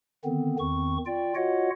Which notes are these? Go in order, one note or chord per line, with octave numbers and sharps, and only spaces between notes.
D3 D#3 B3 C4
E2 D#3 C4 C#6
F4 D5 G5
F4 F#4 C#5 D#5 F#5